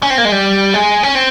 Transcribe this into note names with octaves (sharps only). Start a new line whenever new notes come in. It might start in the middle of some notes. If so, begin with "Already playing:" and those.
C#4
C4
A#3
G#3
G3
G#3
C#4
C4